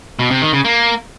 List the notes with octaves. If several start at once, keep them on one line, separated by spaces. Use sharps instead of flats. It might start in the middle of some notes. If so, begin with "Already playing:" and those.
B2
C3
D#3
C#3
A#3